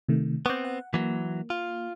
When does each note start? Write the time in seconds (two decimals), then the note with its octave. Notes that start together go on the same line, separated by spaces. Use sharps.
0.08 C3 D#3 A3
0.46 B3 C4 C#6 D6 G6
0.65 F#5
0.94 E3 F#3 A#3
1.50 F4